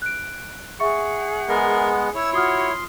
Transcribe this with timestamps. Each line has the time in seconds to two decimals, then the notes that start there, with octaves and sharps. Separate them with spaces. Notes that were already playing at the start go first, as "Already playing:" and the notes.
0.02 F#6 D7
0.80 G#4 E5 F#5 C#6 C#7
1.48 G#3 B3 A#4
2.15 E4 C#5 E6
2.33 F4 F#4 C6 D#6 F6